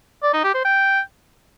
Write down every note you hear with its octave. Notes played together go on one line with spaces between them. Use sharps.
D5
D#4
G4
C5
G5